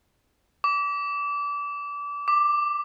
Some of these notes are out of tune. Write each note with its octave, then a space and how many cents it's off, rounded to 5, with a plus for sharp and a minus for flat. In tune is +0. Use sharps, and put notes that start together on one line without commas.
D6 -25
D6 +10